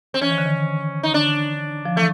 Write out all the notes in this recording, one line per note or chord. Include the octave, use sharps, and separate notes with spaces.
C4
E3 C#4
D#3
D3
D#3
D#4
D3 D4
F3
E3 A3